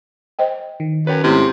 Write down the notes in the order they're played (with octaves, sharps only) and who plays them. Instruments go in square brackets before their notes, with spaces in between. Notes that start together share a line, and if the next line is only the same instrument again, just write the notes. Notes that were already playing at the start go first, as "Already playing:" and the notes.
[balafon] C5 D#5 G5
[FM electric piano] D#3
[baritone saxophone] F#2 [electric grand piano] B4 C#5 G5
[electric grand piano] G#2 A3 C#4 [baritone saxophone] C3 [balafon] E4